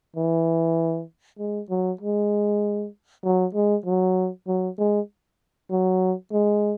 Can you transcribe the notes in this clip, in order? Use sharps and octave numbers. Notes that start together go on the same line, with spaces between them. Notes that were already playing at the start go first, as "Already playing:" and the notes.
E3
G#3
F#3
G#3
F#3
G#3
F#3
F#3
G#3
F#3
G#3